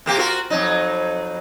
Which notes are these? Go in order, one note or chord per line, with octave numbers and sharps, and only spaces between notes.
C3 A#3 G4
F4 F#4 A#4
F2 F#3 D#4